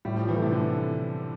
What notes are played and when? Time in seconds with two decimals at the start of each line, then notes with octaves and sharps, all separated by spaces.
0.05 A2 G3
0.16 F3
0.28 E3
0.36 A3
0.42 C3
0.51 D3